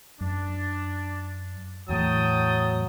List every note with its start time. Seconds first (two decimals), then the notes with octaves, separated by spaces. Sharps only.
0.21 F#2 D4
1.89 E2 A2 F#3 G5 A5 D#6